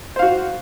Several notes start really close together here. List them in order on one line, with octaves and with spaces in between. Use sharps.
C5 F5 F#4